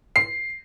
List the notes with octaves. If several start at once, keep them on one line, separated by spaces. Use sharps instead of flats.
C7